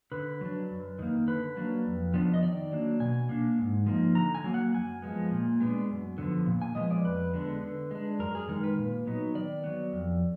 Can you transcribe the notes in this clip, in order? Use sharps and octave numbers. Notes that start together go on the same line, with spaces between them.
D3 B4
F#3 D4
F#2
D#3 A#3
D3 B4
F#3 A#3 D4
F2
F3 B3 D4
D#5
D#3 D5
F#3 A#3 D4
B2 G#5
A#3 D4
G#2
F3 A#3 D#4
D3 A#5
G#5
F#3 A#3
F#5
F#2 G#5
F3 G#3 B3
A#2
G#3 B3 D4
F#2
D3 F3 B3
A#2
G#5
F3 G#3 B3 D#5
D5
F2 B4
D3 G#3 B3 D4
D3
G#3 D4
F#2 A#4
G#4
D#3 G#3 D#4 A#4
B4
A#2
F#3 B3 D#4
D#3 D5
F#3 B3
F2